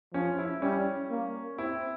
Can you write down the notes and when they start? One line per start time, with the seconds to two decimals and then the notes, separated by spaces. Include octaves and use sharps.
0.13 F3 C#4
0.38 E4
0.62 G3 C#4
1.10 A#3
1.58 C4 E4